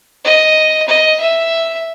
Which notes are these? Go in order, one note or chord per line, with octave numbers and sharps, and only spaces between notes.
D#5
D#5
E5